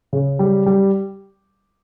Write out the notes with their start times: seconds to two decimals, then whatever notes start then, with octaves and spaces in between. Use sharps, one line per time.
0.13 C#3
0.39 G3
0.66 G3